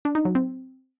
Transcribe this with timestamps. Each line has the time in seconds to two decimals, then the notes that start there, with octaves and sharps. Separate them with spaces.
0.05 D4
0.15 D#4
0.25 F#3
0.35 C4